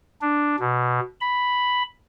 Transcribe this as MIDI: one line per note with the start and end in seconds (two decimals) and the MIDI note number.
0.21 0.56 62
0.60 1.00 47
1.21 1.83 83